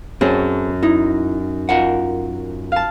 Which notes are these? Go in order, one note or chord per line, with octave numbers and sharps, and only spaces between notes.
F#2 C4 G#4 A4
D#4 E4
F4 A#4 F#5
F5 A5